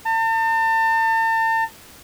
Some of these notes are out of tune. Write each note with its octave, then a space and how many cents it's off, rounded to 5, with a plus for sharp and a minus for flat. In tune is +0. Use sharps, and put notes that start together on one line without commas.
A5 +40